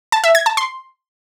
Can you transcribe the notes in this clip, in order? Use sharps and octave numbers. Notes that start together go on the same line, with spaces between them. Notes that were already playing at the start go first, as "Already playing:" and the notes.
A5
E5
G#6
A5
C6